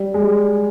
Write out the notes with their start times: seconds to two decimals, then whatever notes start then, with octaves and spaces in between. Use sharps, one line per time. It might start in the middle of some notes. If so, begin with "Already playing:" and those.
Already playing: G3
0.14 G#3
0.23 G3